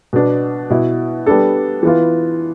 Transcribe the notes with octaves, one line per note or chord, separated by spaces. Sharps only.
B2 B3 D4
B2 B3 E4
G3 B3 D4 A4
E3 B3 F4